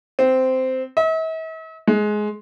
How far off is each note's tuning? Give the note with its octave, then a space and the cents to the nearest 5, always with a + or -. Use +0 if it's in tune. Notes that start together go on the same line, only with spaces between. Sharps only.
C4 -10
E5 -45
G#3 +15